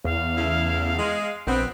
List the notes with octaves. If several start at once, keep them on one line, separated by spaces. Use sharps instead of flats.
E2 F5
C#3 A3 E4
G#3
A#1 B3 C4